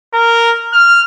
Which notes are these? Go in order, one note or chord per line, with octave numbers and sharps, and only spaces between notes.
A#4
F6